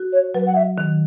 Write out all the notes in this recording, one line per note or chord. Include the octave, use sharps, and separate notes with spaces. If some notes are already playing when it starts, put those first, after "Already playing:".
Already playing: F#4
C#5
F#3 B4
F#5
E5
D#3